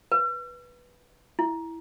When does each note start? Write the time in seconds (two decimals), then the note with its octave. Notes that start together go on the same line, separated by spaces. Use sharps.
0.12 B4
1.39 E4